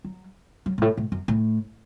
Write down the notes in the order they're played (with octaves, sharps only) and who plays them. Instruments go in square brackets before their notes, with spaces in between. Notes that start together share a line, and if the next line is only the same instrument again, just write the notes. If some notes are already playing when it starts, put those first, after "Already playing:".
[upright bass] F#3
F#3
G#2
A2
A2
F#2
A2